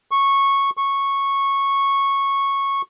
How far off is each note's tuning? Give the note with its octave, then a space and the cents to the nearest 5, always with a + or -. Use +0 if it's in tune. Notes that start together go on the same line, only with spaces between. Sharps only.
C#6 -10
C#6 -10